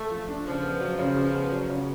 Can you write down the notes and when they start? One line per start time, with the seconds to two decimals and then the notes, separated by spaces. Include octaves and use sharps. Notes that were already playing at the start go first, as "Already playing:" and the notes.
Already playing: A3
0.10 F3
0.28 D4
0.46 C#3 F3
0.63 B3
0.81 F#3
0.99 C#3
1.16 C#3
1.34 B3
1.52 F#3
1.69 C#3